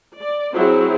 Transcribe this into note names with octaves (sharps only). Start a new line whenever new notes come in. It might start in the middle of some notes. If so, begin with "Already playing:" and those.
D5
F#3 C4 E4 G#4